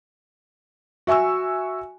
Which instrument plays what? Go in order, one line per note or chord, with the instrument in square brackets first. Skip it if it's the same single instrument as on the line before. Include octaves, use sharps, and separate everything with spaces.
[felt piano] F#4 E5 G#5 C#6 E6